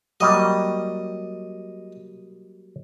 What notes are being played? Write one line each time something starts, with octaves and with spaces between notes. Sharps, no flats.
F#3 G3 A#3 D#5